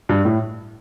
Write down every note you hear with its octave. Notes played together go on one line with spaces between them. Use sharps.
G2
A2